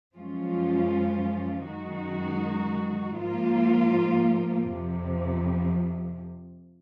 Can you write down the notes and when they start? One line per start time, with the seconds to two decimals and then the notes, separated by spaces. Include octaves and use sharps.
0.15 F#2 F3 G#3 C#4 F4
1.66 F#2 D#3 G#3 D#4 F#4
3.17 G#2 F3 A#3 F4
4.69 F2 C3 F3